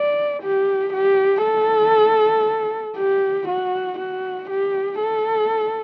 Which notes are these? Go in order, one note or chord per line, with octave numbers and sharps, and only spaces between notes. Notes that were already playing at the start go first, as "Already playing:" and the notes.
Already playing: D5
G4
G4
A4
G4
F#4
F#4
G4
A4